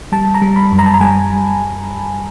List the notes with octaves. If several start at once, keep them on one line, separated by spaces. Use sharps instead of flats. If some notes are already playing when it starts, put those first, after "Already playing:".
G3 A5
A#5
G3
B5
F#2
A#5
A5
A#5
G3 G#5